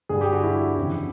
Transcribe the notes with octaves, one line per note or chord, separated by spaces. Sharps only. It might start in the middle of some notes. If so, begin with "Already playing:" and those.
G2 D3 G3 G#4
G4
F#4
E4
F2 C#3 E3